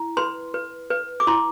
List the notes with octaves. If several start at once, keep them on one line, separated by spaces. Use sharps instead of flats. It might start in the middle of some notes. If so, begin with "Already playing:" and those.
Already playing: E4
B4 C6
B4
B4
D6
E4 C6